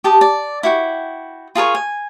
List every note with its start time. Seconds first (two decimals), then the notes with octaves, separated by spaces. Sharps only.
0.04 G4 A5 D#6
0.21 D5
0.63 E4 F#4 G5
1.55 F4 G#4 A#4 C#5
1.75 G#5